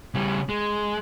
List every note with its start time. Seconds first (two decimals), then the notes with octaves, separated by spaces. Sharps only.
0.15 C#3 G3
0.49 G#3